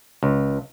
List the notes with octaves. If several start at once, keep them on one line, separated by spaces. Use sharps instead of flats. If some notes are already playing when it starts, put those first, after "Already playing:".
C#2